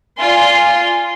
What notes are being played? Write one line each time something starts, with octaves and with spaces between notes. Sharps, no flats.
F4 D5 G#5 C6